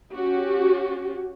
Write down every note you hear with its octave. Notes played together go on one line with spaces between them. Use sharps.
C#4 F#4 G4